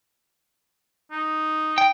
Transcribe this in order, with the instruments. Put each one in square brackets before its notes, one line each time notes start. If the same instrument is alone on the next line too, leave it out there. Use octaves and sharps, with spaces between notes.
[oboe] D#4
[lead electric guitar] G5